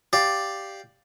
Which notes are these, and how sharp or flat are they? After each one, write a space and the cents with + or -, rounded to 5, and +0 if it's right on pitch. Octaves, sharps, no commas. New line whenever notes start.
G4 +0 D5 +5 F5 +0